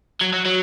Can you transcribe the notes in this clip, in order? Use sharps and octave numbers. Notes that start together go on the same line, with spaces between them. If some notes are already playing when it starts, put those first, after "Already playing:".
F#3
F#3
F#3